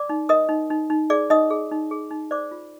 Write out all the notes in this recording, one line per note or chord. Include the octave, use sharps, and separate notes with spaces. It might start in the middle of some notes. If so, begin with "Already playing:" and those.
Already playing: D5 D6
D#4
A#4 D#5 D#6
D#4
D#4
D#4
G#4 D5 D6
D#4 D#5 D#6
G#4
D#4
G#4
D#4
C5 D5 D6
F4